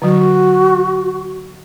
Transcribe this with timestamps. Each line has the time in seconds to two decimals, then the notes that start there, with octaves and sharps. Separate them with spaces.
0.02 D3 F#3 F#4